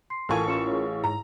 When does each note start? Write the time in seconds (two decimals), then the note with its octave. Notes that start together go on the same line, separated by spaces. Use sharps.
0.10 C6 C7
0.29 A1 F4 A4 A#4 F5 G#5 A5 C#6
0.48 C#4 F4 A#4 C#7 E7
0.67 G#4 C#5
1.04 G#2 A#5